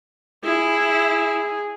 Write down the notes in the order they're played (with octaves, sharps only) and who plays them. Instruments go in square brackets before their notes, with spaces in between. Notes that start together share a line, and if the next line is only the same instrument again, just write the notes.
[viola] E4 [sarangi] G#4